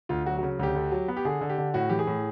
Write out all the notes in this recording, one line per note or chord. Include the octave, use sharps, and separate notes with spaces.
D2 F4
F#3 F#4
F#4
C#3
D2 G4
D3
F#3
B3
G4
D3 G#4
D3
G4
D3
A2 F#4
E3 G4
G#4
A2